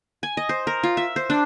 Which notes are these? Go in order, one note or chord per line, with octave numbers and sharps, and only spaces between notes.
G#5
D#5
C5
A#4
F4
E5
C5
D4